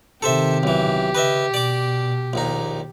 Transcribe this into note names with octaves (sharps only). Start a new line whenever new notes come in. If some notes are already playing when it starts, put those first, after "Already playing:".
C3 D#3 G4 A4 C5 E5
B1 E3
C#3 B4 D#5 E5
B2 D5 D6
A#1 D#2 D#4